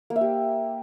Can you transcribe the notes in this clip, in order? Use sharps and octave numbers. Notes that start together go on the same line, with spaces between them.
A#3
E5
G4